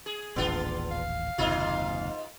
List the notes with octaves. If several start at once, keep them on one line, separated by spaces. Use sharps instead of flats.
G#4
D#1 A1 D#2 B3 D4 F4
F5
F#1 D#2 G#2 C3 D#4 F4